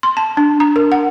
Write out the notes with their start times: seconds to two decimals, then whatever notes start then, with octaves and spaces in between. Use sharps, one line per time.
0.03 C6
0.17 A5
0.37 D4
0.60 A#5
0.76 A#4
0.92 F#5